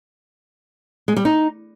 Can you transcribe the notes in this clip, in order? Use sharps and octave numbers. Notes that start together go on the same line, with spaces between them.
G#3
G3
D#4